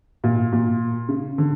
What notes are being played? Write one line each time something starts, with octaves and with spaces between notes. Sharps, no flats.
A#2
A#2
C#3
D3